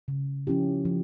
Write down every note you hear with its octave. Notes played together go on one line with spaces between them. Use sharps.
C#3
F3 C#4 E4 G4
F3